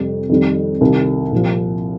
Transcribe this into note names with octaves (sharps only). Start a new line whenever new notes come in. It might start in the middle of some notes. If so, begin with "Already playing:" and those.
Already playing: F2 C3 G3
F2 D#3 G3
C2 C3 D#3
C2 A#2 F3